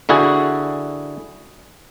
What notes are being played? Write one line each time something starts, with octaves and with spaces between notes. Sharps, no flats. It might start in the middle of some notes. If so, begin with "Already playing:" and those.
D3 E4 F#4 G#4